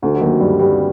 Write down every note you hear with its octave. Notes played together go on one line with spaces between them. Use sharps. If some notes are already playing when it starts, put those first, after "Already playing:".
D2 D3
F#3
D#2 D#3
G2 G3
G2 G3